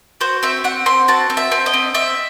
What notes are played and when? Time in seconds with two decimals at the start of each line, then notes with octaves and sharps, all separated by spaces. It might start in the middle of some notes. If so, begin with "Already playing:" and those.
0.21 F#4 C5
0.43 C4 E5
0.64 C4 F#5
0.86 C4 C6
1.08 F#4 A5
1.30 C4
1.37 E5
1.52 C4
1.66 D#5
1.74 C4
1.94 C4 E5